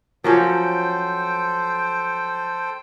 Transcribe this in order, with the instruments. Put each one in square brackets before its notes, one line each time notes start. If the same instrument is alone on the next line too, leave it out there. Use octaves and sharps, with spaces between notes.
[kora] F3 F#3 C#4 [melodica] A4 C5 G5